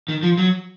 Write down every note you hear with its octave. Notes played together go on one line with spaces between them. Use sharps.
D#3
F3
F#3